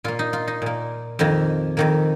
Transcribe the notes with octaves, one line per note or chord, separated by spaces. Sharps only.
A#2 A#3 F4
D#4
F4
D#4
A#2 A#3
F2 D#3 A#3
F2 D#3 A#3